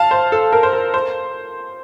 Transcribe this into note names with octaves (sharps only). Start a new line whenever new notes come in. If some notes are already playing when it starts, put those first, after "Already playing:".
Already playing: F5 A5
C5
A4
A#4
C5
A#4
C5